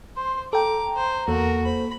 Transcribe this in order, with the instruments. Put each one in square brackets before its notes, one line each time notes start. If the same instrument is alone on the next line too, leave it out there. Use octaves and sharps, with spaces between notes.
[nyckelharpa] C5 [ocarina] C6
[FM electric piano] A4 G5 [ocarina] A#5 [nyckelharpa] D6
[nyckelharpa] C5
[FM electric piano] E2 [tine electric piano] A#3 A4 [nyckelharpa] F#4 A#4
[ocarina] C5 [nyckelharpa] B5